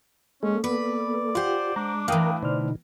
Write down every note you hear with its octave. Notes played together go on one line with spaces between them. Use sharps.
G#3 A#3 C#4 A4
B3 B4 D5
F4 G4 C5 F#5
G#3 D4 A#5 D6
A2 E3 A#4 F5 G5 A#5 D#6
B2 D3 D#4 C5 D5 F6